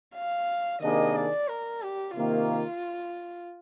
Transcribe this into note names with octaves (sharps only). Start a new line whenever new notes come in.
F5
C3 D#3 A#3 D4 G#4 D#5
D5
A#4
G4
C3 D#3 A#3 F4